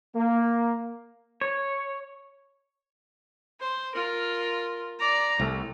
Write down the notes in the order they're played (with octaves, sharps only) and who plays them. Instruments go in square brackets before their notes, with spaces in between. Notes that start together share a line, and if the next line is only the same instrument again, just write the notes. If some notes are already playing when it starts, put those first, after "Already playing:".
[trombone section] A#3
[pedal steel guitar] C#5
[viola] C5
F4 A#4
D5 A#5
[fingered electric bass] C2 [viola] A3